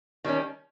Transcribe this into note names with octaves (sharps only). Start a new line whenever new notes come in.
D#3 G3 C#4